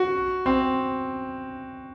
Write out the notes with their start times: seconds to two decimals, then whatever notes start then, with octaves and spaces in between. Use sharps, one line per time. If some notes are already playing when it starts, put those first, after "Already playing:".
Already playing: F#4
0.46 C4